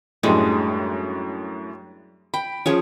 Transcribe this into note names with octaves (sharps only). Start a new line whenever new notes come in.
F#2 A2 G3 G#3 D4
G5 B5
F3 C#4 F4 G#4 C#5